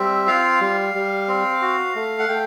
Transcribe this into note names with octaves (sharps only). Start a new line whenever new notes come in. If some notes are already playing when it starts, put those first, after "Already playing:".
Already playing: G3 C4 E5
F4 F5
G3
G3
C4
F#4
A3
F#5
A3 G5